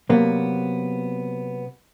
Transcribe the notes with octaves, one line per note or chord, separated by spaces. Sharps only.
C3 F#3 A#3 B3